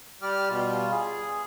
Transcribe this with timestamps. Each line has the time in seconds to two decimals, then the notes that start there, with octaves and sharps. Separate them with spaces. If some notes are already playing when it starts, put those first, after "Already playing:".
0.22 G3 G4 D5 F6
0.50 B2 G3 F4
0.91 G#4